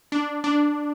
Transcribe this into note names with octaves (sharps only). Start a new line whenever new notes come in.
D4
D4